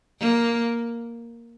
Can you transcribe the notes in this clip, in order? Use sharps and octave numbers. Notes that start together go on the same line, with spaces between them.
A#3